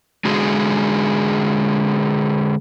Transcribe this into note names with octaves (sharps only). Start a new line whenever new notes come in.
D3 G#3 F#4 G#4